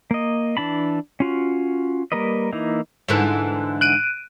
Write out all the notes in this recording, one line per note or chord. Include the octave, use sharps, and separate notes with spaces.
A#3 D#5
E3 D4 A5 B5
C#4 F4 F#4
G3 A#3 A#4 B4 D#5
E3 A#3 D#4 E4
G#2 D3 E3
F#6 D7 D#7